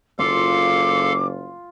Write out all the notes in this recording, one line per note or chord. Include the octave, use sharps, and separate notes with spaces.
F#1 F4 A4 F5 D6